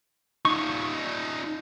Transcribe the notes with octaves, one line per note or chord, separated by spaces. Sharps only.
D#4 F4 C#6